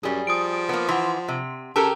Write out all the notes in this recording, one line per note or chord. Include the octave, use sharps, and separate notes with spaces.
F#2 G3 G#4
F3 D#6 D7
A#3 B3
E3 F#5 C6
C3
C#3 G4 A4 A#4 A5